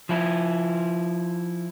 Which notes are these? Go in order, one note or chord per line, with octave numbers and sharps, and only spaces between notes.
F3 E4